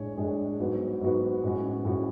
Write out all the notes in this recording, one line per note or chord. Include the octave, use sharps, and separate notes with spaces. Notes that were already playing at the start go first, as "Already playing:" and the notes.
Already playing: A2 G#3 D4 G#4 C#5
A2 G#3 D4 G#4 C#5
G#2 F#3 B3 F#4 B4
G#2 F#3 B3 F#4 B4
A2 G#3 C#4 F#4
A2 G#3 C#4 F#4